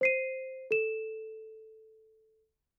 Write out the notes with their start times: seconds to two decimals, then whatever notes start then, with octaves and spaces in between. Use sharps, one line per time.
0.01 C5 C7 D#7
0.71 A4 E7